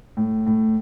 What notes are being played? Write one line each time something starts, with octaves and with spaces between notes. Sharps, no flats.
A2
A2